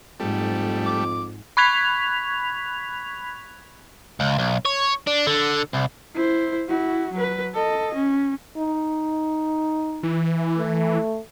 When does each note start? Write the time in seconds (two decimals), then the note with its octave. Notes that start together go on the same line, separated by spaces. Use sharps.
0.20 F2 G#2 G3 A3
0.86 D6
1.57 B5 C#6 F#6 G#6 B6 F7
4.20 C#2
4.39 B1
4.66 C#5
5.07 D4
5.27 D3
5.74 C2
6.15 E4 C5
6.68 E4 F#4
7.14 F#3 B4
7.55 A4 D#5
7.95 C#4
8.57 D#4
10.03 E3
10.58 A3